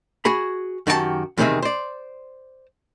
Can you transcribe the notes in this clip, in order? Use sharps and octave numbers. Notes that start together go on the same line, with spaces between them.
F#4 G#4 B5
F#2 D#3 F#4 G4 A4 A5
E2 C3 D#3 C4 G#4 E5
C5 D5